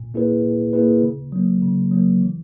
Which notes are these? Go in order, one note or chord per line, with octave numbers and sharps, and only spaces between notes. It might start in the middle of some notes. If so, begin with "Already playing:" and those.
Already playing: A#2
A#3 E4 G#4 B4
A#2
A#3 E4 G#4 B4
C#3
F#3 A#3
C#3
F#3 A#3
E3